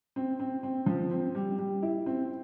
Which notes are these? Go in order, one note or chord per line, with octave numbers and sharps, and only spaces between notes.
C4
C4
C4
F3
C4
G3
G3
E4
C4